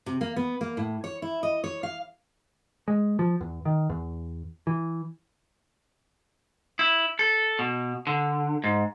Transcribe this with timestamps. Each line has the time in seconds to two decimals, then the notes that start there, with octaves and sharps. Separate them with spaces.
0.06 C3
0.21 A#3
0.36 B3
0.61 A#3
0.77 A2
1.04 C#5
1.22 E4
1.43 D#5
1.64 C#5
1.83 F5
2.88 G#3
3.19 F3
3.41 E2
3.65 D#3
3.90 E2
4.67 E3
6.79 E4
7.19 A4
7.59 B2
8.07 D3
8.64 G#2